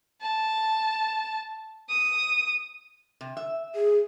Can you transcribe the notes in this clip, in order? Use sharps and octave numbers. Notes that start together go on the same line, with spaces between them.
A5
D#6
C3
E5
G#4